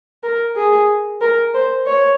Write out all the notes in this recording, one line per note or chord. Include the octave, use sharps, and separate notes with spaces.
A#4
G#4
A#4
C5
C#5